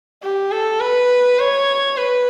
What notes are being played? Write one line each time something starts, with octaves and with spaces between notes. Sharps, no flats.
G4
A4
B4
C#5
B4